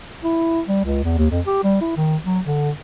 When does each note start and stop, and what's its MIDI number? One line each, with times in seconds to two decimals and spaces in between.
0.24 0.61 64
0.68 0.83 55
0.85 1.02 37
1.04 1.16 40
1.18 1.27 39
1.31 1.41 41
1.47 1.59 67
1.64 1.77 55
1.81 1.92 64
1.97 2.17 51
2.25 2.40 54
2.45 2.70 50